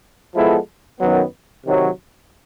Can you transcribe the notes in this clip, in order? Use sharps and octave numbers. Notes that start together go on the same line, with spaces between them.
F3 G#3 B3 E4 A4
F#2 D#3 F#3 B3
C3 D#3 F#3